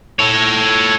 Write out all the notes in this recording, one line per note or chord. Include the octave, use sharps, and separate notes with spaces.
A4 C#5